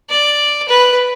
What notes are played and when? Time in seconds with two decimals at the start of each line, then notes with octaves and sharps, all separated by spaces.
0.10 D5
0.68 B4